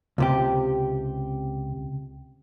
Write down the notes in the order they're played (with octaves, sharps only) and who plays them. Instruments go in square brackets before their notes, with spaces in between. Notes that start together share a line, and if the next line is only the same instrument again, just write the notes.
[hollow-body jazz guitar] C#2 C3 G4